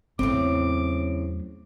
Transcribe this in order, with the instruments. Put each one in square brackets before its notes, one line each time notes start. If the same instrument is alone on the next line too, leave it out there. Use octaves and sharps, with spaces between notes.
[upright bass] E2 F#3 [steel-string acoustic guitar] A2 C#3 [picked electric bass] C4 [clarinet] D6